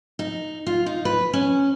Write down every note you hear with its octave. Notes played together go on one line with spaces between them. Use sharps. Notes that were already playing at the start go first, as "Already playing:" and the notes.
D#4
F4
D#4
B4
C#4